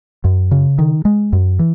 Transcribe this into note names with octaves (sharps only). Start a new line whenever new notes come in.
F#2
C#3
D#3
G#3
F#2
E3